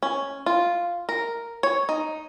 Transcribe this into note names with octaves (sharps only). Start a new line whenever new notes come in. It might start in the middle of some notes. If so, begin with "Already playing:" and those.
C#4
F4
A#4
C#5
D#4